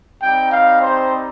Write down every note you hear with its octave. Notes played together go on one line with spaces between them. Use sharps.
G3 C4 D#4 G5
F5
C5